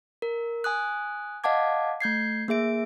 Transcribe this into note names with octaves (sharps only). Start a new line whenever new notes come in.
A#4
G#5 D#6 F#6
D#5 F5 F#5 A5 D6 G#6
A3 G6 G#6 C7
A#3 G#4 E5 D7